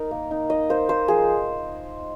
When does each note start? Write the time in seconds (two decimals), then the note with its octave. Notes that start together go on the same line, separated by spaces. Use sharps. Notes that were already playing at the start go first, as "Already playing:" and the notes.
Already playing: D#4 A#4
0.11 A#3
0.31 D#4
0.50 D#4 D#5
0.70 A#3 C5
0.89 A#3 C5
1.08 F3 G#4